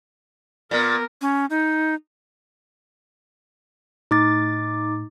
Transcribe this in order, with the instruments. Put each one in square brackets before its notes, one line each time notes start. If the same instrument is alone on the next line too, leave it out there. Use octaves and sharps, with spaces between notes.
[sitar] A#2 [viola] B3 A#4
[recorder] C#4
D#4
[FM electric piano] A2 [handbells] D#4 D6 A6